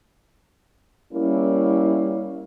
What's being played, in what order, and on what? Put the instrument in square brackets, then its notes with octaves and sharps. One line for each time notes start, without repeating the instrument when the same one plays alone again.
[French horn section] G3 A#3 C#4 E4